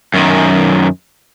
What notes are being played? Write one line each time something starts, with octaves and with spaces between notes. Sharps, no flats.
F#2 D#3